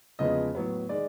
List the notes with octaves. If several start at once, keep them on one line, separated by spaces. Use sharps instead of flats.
E2 C#3 F3 G#3 B3 D#5
A2 F#3 B3
D#3 G#3 D5